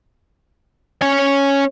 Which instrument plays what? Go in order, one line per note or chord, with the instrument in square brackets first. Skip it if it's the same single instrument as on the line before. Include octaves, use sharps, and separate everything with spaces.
[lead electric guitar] C#4 G#5